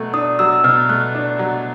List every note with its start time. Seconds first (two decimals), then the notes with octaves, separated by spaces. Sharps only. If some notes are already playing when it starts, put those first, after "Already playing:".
Already playing: B2 F#3 A3
0.13 D4 D#6
0.39 F#3 E6
0.64 B2 F6
0.89 A3 F#6
1.15 D4
1.39 F#3